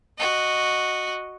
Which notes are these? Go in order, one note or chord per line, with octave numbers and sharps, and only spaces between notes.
F#4 D#5